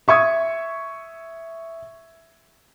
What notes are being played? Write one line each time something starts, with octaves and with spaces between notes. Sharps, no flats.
E5 C#6 D#6 G#6